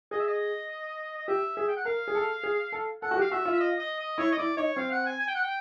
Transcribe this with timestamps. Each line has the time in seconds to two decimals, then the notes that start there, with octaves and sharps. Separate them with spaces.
0.11 G#4 D#5
0.19 E5
0.27 D#5
1.17 D#5
1.28 G4 E5
1.57 G#4 E5
1.67 G5
1.76 F#5
1.85 A#4 F5
2.08 G#4
2.15 A4
2.43 G#4
2.72 A4
3.02 A4 F#5
3.11 F#4
3.17 G4
3.21 F5
3.31 F#4 E5
3.45 F4
3.53 E5
3.60 D#5
3.80 D#5
3.99 D#5
4.18 E4 C#5
4.32 D#5
4.37 E4 D5
4.57 D#4 C#5
4.76 C4 F5
4.91 F#5
5.06 G#5
5.20 G#5
5.27 G5
5.35 F#5
5.42 G5